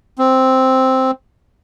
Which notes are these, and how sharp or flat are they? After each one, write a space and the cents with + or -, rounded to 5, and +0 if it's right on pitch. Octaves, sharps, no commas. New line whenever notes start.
C4 +0